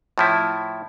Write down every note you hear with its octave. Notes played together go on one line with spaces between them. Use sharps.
A2 F3 E4